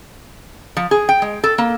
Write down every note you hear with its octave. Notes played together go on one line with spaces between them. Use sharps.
F3
G#4
G5
G#3
A4
A#3